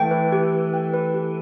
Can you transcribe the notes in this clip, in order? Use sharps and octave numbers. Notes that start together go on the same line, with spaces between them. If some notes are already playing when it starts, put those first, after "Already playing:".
Already playing: E3 A3 G5
B4
G4
G4
G5
B4
G4